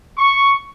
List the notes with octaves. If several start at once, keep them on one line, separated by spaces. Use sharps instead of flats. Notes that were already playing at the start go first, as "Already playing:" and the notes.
C#6